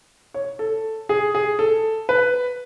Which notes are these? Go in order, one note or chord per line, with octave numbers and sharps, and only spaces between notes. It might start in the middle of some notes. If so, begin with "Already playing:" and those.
C#5
A4
G#4
G#4
A4
B4